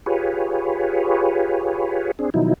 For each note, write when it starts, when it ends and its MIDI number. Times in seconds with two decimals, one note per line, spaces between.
0.06 2.11 65
0.06 2.11 67
0.06 2.11 68
0.06 2.11 71
0.06 2.11 73
2.19 2.30 60
2.19 2.30 62
2.19 2.30 68
2.34 2.54 47
2.34 2.54 51
2.34 2.54 53
2.34 2.54 54
2.34 2.54 63
2.34 2.54 64